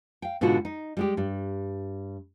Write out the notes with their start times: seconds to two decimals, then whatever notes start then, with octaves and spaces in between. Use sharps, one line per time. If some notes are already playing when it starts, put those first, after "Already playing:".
0.22 F5 G5
0.41 G#2 B2 D3 D4 F4 F#4
0.65 D#4
0.97 G3 G#3 G4
1.17 G2 G3